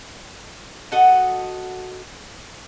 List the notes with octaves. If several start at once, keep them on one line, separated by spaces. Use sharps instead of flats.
F#4 A4 D#5 F#5